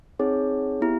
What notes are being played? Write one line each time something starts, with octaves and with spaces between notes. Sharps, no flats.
C4 D#4 G#4 C#5
B3 E4 G4